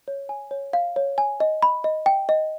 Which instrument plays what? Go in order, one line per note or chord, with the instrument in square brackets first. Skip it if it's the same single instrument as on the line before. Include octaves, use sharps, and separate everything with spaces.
[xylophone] C#5
G#5
C#5
F5
C#5
G#5
D#5
B5
D#5
G5
D#5